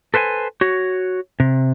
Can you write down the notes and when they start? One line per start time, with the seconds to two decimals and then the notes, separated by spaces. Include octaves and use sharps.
0.14 A4 B4 C5 G5 G#5
0.61 F#4 C#5
1.40 C3